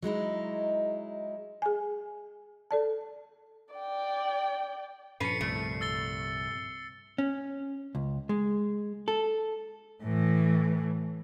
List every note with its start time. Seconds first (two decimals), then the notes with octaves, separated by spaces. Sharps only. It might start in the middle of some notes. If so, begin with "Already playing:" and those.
0.02 F#3 G#3 D#4 E4
1.62 G#4 G#5
2.71 A4 D5 A5
3.75 D5 G5
5.20 G2 A#2 F3 C#4 A4 B4 C7 C#7
5.41 C2 A3
5.81 E6 A6 G7
7.18 C#4
7.95 C#2
8.29 G#3
9.08 A4
10.03 A2 E3